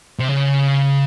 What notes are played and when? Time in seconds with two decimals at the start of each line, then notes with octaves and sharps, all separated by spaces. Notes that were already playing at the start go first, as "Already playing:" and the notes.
0.19 C3
0.29 C#3